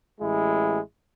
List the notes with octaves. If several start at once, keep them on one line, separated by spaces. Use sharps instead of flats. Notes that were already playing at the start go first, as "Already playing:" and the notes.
A1 G#3 E4